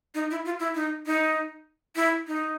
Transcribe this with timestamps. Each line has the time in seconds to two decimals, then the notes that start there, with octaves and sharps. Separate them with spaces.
0.15 D#4
0.31 E4
0.45 F4
0.60 E4
0.75 D#4
1.06 D#4
1.96 E4
2.27 D#4